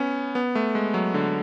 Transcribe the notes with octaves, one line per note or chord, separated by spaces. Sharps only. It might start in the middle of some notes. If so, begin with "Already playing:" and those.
Already playing: B3 C#4
B3
A3
G#3
F#3
D3